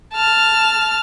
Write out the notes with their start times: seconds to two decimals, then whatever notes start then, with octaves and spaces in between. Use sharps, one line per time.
0.14 A5 F6